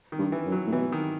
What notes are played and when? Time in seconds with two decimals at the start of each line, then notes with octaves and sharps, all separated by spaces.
0.12 D#3
0.18 G2
0.32 E3
0.46 F#2
0.52 F#3
0.67 A2
0.72 B2 E3
0.92 D#3